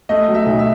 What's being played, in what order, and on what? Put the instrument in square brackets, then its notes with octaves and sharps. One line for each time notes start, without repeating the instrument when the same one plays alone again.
[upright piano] A3 [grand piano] D#5
[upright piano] F#3
[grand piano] E5
[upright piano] B1
[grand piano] E5